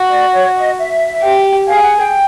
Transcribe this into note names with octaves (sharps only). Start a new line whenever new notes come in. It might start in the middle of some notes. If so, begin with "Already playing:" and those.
Already playing: F#4
D5
C#5
D#5
E5
G4
G#4 F5
F#5
G5